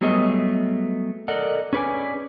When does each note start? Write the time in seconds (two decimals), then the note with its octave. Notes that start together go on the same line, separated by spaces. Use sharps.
0.01 F#3 G3 A3 B3 G#4 D#5
1.28 A4 A#4 D5 D#5 F#5
1.73 C#4 G#4 B4 C5 D5 G#5